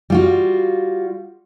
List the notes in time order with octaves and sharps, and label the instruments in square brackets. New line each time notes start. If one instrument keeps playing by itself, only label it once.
[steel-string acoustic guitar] G3 F4 F#4